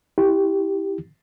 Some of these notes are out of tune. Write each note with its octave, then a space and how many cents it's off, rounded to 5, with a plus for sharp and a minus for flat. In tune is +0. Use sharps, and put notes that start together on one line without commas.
E4 -15 G4 +0